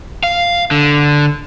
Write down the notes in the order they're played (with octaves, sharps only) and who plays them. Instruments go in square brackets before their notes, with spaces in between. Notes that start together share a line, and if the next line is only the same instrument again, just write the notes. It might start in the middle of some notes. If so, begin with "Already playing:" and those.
[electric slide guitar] F5
D3